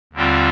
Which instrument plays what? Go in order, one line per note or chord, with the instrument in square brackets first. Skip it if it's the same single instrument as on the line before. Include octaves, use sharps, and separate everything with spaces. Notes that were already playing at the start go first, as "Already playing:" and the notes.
[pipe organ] D#2 D3 G3 C4 F4